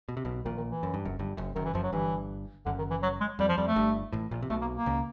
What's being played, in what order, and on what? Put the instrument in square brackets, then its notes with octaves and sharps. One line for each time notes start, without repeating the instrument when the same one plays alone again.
[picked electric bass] B2
C3
B1 B2
[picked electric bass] A#1 A#2 [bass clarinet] D#3
[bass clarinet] D#3
E3
[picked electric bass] F#2
G2
F#1 F#2
G1 G2
F#1 F#2
[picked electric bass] F#1 F#2 [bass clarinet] D#3
[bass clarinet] E3
[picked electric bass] F#1 F#2 [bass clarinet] F3
[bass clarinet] F#3
[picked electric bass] G1 G2 [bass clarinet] E3
[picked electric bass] F#1 F#2 [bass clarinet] D3
[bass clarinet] D#3
E3
F#3
G#3
[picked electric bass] F2 [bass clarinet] G3
[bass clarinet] F3
[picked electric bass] F2 [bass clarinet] G3
[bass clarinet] A3
[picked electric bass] G1 G2
A1 A2
A#1 A#2
C3
[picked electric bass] B1 B2 [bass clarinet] A3
[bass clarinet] A#3
A#3
[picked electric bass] C#2 C#3